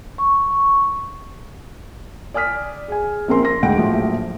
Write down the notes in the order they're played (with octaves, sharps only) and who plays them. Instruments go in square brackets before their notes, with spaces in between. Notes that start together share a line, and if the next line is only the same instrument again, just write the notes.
[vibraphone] C#6
[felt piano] D5 G#5 D#6 F6 B6
G#4 G#5
A#1 C4 C#4 A#4 C6
C6 A#6
D2 G#2 F#5 G5 D7
A#1 A2 F3 F#3